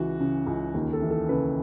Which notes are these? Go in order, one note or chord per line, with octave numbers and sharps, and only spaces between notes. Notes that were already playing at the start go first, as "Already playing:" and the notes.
Already playing: C#2 E3 F#4
C#3
C#2
D#2
A4
E3
A4
C#3 B4